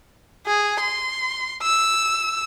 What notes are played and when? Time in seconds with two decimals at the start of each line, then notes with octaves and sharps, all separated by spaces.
0.46 G#4
0.81 C6
1.62 E6